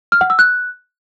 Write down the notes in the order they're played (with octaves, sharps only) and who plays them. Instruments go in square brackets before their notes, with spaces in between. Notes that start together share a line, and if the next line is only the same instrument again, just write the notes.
[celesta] F6
F#5
E6
F#6